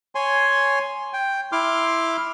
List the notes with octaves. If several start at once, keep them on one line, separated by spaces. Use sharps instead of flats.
C#5 G#5 C6
G5
E4 C6 D6 F6